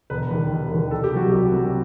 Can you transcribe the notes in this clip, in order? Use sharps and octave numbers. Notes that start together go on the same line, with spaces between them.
E1 B4
D#2 D#3 G3
E1
D#2 D#3 G3
C2 A4
G4
C3 F#3 F#4
C2 G4
C3 F#3